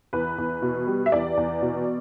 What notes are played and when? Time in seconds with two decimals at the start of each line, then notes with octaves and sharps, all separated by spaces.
0.13 E2 B4
0.38 E2
0.62 B2
0.87 G3
1.06 E5
1.12 E2 D5
1.37 E2
1.62 B2